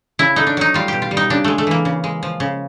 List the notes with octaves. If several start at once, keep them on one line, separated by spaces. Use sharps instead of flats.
C#3 E4
A3 D#4
D4
F#3 D#4
G3 F4
B2 G4
F4
G3
D#4
C#3 D4
G#3 A3
A3
E3 A#3
C#3
G#3
F3
C#3